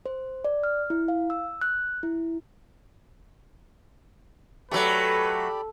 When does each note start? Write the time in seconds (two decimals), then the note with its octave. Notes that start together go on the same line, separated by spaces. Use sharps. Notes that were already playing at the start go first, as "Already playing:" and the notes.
0.06 C5
0.44 D5
0.63 F6
0.90 E4
1.08 F5
1.30 E6
1.61 F#6
2.03 E4
4.71 F#3 A3 G4 A4 B4 D5 B5